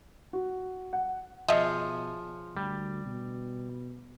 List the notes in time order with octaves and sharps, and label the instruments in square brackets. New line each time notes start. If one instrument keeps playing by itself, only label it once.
[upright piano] F#4
F#5
[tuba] B2 [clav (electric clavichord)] F3 G#4 C#5 [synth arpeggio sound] D#5 E5
[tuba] D2 [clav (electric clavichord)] G3
[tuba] B2